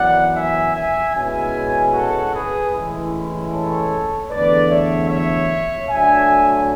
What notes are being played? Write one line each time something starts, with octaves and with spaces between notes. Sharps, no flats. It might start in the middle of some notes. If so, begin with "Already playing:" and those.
Already playing: F#2 E3 B3 D5 F#5
E5 G#5
E5 G#5
B2 G#3 C#4 E4 E5 G#5
F#4 A4
G#4 B4
A2 E3 G#3 C#4 E4
A4 C#5
E2 D3 A3 B4 D5
C#5 E5
C#5 E5
D2 D3 F#3 E5 G#5